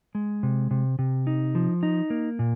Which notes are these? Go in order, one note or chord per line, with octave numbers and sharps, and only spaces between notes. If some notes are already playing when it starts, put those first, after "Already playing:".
G#3
C3
C3
C3
D#4
F3
D#4
A#3
A#2